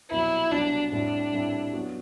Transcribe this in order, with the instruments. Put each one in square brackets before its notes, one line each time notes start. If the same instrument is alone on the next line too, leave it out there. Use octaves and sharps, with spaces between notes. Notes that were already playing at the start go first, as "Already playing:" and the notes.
[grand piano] C2 B2 F#3 [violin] E4
[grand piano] C2 B2 F#3 [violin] D4
[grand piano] A2 G3 C4 E4 [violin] D4
[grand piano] A2 G3 C4 E4
F#3 B3 F#4